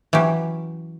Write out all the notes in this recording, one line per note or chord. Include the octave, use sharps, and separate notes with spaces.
E3 F#3 C#4 G4